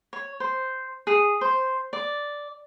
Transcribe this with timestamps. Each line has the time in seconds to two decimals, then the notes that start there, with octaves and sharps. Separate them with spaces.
0.13 C#5
0.40 C5
1.07 G#4
1.41 C5
1.93 D5